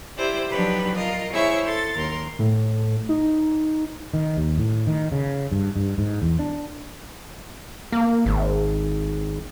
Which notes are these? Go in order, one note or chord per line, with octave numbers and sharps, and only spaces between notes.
E4 G4 C5 D5
F3 F#3 D4 D#4 G4 B4
F4 A#4 D#5
E4 G#4 C5 C#5 E5 C#6
A4 C6 A6
D#2 A#4 C6
A2
D#4
D#3
D#2
A2
D#3
C#3
G2
G2
G#2
E2
D4
A#3
G#1